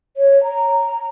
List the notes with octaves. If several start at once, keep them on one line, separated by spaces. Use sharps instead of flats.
C#5
A#5